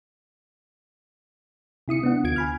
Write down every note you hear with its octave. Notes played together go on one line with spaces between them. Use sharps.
C3 E4 D#6 C#7
B3 D4 F#5
D2 F4 G#6 D7
G#5 B5 F6